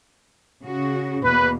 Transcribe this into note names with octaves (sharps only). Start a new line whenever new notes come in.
C#3 F#4
E2 B2 A#3 B4